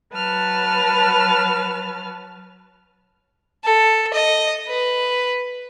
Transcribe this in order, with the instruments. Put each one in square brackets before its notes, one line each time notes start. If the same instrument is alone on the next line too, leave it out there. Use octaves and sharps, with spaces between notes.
[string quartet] F#3 B4 A5 F6
[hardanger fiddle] A4
D#5
B4